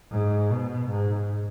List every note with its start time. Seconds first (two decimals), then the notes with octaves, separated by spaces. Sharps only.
0.11 G#2
0.50 B2
0.90 G#2